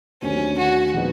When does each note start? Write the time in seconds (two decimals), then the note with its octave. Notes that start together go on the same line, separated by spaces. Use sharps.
0.22 D#2 D3 F#3 A3 C4 C#4
0.58 F#4
0.94 A#2 F3 G#3 B3 D#4